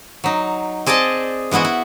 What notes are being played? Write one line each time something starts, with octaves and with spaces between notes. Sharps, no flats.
F#3 D#4
C4 G#4 D5 D#5 A5
E3 G#3 B3 E4 F#4
E4